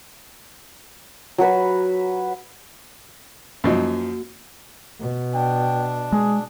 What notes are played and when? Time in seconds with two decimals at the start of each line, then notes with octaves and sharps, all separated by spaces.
1.38 F#3 F#4 B4 B5
3.64 F#2 F3 A#3 D#4 F#4
5.00 B2
5.34 D4 G5
6.12 G#3 G#4